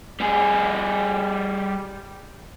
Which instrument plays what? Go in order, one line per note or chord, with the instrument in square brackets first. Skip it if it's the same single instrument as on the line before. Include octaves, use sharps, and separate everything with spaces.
[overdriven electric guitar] G3 G#4